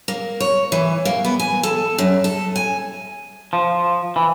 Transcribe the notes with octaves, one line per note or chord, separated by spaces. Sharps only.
A#3
C#5
E3
A#3
B3
G#5
A4
F#2
A4
G#5
F3
E3